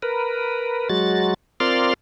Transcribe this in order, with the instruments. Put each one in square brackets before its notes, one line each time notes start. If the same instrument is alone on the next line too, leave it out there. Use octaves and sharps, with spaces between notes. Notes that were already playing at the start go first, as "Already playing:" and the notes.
[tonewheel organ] A#4 B4
F#3 G#3 F#4 A6
C4 F4 A#4 D5 C6 F6